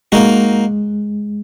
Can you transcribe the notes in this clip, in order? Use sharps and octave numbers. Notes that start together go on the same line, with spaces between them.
G#3 A#3 D#4 F#4